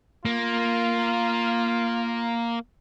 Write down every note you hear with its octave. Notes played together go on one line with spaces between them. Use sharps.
A#3 F4